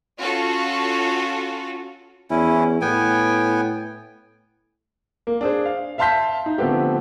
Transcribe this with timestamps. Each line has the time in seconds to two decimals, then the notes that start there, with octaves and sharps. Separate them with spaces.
0.17 C#4 F4 F#4 A4
2.30 E2 C#4 E4
2.81 A2 B3 G5 G#5
5.27 A#3
5.41 D4 G#4 C5
5.65 F5
5.98 E5 F5 A5 C6 G6 B6
6.46 D#4
6.58 D3 F3 A3 B3 C4 G4